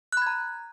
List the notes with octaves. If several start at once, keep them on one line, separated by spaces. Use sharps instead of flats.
A#5 B5 F#6 G#6